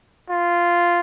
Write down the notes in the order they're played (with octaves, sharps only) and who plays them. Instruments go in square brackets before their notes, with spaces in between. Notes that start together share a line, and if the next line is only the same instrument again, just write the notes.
[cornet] F4